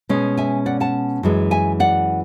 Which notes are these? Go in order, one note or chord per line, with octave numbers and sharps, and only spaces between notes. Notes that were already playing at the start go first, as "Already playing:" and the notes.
B2 G#3 C#4
E5 G#5
D5 F#5
F#5 A5
F#2 E3 G#3
E5 G#5
D5 F#5